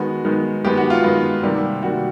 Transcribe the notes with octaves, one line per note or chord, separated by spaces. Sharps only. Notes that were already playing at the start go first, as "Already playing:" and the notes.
Already playing: D#3 G#3 B3 F#4
D#3 G#3 B3
D#3 G#3 B3 G4
F#4
F4
D#3 G#3 B3
C3 D#3 G3 A#3
C3 D#3 G3 A#3 F#4